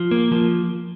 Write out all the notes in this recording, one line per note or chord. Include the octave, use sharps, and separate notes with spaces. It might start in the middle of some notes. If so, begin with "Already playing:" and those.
Already playing: F3
A#3
F3